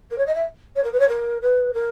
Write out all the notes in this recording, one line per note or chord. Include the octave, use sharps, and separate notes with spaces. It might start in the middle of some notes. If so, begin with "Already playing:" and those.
A#4
C#5
D#5
E5
C#5
A#4
B4
C#5
A#4
B4
A#4